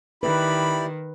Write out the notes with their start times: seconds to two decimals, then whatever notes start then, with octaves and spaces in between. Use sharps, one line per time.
0.23 D#3 E4 G4 B4 D5 B5